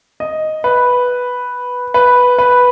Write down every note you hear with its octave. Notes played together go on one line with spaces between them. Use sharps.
D#5
B4
B4
B4